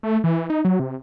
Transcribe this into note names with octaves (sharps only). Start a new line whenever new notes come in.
A3
E3
D#4
F#3
C3